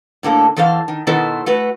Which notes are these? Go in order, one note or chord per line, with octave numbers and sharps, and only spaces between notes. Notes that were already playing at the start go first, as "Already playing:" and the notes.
A2 D3 A#3 A4
E2 E3 A4 C5 F5
D#3
B2 D#3 B3 E4 A4 C5
A3 F#4 B4